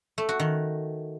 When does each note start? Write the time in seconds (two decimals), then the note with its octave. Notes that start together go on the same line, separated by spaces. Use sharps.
0.18 A3
0.29 F#4
0.40 D#3